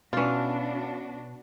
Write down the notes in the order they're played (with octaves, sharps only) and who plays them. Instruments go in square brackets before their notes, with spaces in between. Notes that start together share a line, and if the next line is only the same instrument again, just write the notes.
[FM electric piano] B2 [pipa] E3 F4 [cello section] B3 D4 F#4 [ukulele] C#4 D5